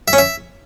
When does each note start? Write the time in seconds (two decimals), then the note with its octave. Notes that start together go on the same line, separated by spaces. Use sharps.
0.08 E5
0.13 C#4
0.18 E5